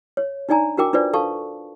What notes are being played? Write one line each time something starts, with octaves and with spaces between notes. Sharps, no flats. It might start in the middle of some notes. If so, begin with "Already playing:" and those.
C#5
D4 D#4 D5 G#5 A#5
D4 F#4 A#4 G5 D6
D4 F4 B4 C5 D5
A4 F5 A5 C#6